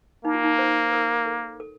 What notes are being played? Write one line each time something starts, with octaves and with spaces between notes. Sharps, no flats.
A#3 D#4
F4
D#4
C5
A#4
A4
A4